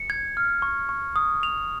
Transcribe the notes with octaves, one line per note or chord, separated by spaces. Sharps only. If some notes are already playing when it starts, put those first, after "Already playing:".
Already playing: C#7
G#6
F6
C#6
C#6
D#6
F7